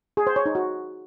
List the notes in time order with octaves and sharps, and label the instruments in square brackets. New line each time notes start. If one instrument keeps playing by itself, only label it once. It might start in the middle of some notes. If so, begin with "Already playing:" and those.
[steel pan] G#4
C5
C#5
D#4
F#4